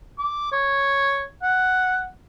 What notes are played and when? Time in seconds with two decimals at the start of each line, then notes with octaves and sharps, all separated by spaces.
0.19 D6
0.52 C#5
1.43 F#5